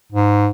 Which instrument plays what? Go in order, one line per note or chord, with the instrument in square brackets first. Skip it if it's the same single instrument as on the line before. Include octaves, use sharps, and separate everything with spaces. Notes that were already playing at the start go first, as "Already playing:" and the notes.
[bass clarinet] G#2